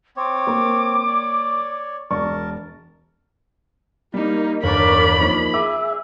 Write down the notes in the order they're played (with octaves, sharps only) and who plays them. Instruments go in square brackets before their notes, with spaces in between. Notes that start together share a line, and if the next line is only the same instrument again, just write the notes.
[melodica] C4 C#5 [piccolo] D6
[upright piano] A#3 A#4
[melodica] C#5 D5
[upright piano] E1 D5 C#6 [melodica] A#4 A5
[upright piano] G3 [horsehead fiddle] A#3 D#4
[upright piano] G1 [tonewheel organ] E2 C#5 [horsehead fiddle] A#4 D5 [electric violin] B5
[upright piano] F3 A#3 D#4
[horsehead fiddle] G#4 [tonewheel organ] E5 [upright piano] D6